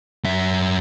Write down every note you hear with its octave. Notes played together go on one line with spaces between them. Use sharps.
F#2 E5